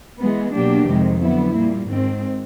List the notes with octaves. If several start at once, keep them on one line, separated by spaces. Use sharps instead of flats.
E3 G#3 B3
B2 F#3 A#3 D4 G4
F2 C3 D#3 G#3
D3 F#3 B3 E4
A#2 G3 A#3
G#2 D#3 G#3 C4